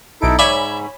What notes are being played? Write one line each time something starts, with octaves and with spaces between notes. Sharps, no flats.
B1 D#4 E4 A4 D7
G#2 C#5 D5 E5 G#5 B5